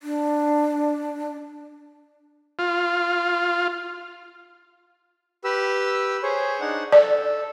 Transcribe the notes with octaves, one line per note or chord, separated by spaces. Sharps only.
D4
F4
G4 B4 E6
G#4 C5 C#5
D4 D#4 F#5
A4 D5